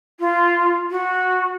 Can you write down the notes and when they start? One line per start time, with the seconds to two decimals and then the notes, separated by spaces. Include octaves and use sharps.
0.20 F4
0.91 F#4